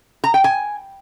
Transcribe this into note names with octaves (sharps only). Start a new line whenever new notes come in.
A#5
G5
G#5